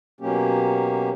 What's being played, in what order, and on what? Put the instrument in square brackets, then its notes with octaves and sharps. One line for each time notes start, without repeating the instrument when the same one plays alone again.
[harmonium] B2 F#3 A#3 C#4 G4